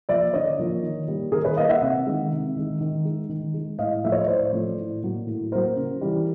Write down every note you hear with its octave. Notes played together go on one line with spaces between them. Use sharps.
F3 A#3 D5 E5
D3 C#5 D#5
F3 A#3
D#3
G3 A#3
D#3 G#4 A#4
B4 C#5
G3 A#3 D#5 F5
E5 F#5
C3 E5 F#5
D#3 G#3
C3
D#3 G#3
D#3
G#3
D#3
G#3
A2 D#5 F5
F3 A3 E5
C#5 D#5
A2 C5 D5
F3 A3
A2
F#3 A#3
A2
F#3 A#3 A#4 C5
C#3
E3 G3